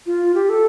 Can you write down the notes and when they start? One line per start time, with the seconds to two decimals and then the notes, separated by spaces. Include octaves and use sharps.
0.06 F4
0.35 G4
0.49 A4